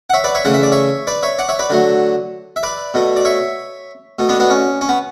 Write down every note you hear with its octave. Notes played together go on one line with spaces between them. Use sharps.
F#5
C#5 E5
B4 D5
C#5 E5
C#3 E3 A3 F#5
E5
D5
C#5 E5
B4 D5
C#5 E5
D5 F#5
C#5 E5
B4 D5
D3 F#3 A3
E5
B4 D5
B2 A3
D5
C#5 E5
B2 A3
B3 D4
B3 D4
C#4
C#4
B3